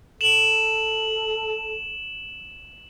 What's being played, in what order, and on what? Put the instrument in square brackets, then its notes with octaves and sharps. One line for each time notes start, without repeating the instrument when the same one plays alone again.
[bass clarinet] A4 [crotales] E7 F#7